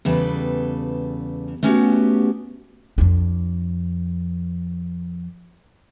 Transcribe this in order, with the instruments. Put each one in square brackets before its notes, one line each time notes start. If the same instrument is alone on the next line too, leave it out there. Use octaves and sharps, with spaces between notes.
[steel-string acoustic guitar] E2 C#3 G3 A4 B4
A3 B3 C#4 F#4 G4
[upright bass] F2 D4